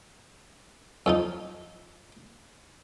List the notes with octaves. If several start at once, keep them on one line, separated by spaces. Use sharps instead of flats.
F2 F3 D#4